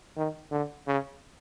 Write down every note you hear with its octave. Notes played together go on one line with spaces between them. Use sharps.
D#3
D3
C#3